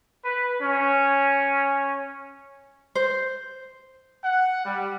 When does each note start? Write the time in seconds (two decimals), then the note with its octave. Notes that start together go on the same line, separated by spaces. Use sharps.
0.25 B4
0.61 C#4
2.95 C5
4.24 F#5
4.65 G3